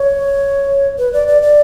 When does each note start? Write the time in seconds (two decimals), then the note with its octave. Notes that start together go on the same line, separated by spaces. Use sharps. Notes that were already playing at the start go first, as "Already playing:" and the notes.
Already playing: C#5
0.99 B4
1.13 D5
1.28 D5
1.42 D5